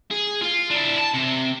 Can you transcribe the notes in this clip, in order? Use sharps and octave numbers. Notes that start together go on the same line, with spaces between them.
G#4
F4
D4 E4
A5
C3